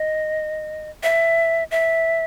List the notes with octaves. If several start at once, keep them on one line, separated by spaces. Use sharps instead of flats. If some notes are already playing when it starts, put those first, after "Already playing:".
Already playing: D#5
E5
E5